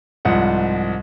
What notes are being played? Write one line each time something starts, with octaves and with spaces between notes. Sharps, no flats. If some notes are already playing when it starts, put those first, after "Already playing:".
C2 G#2 F3 F#5